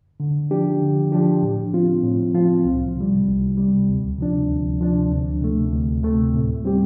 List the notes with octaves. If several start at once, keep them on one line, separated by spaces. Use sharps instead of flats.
D3
F3 D4 G4
D3
F3 D4 G4
A2
F3 C4 F4
A2
F3 C4 F4
C2
C3 G3
C2
C3 G3
D2
C3 F3 D4
D2
C3 F3 D4
D2
C3 A3
D2
C3 A3
A2
G3 C4 G4